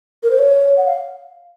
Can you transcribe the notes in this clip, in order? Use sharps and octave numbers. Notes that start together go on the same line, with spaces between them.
A#4
C5
C#5
F#5
F5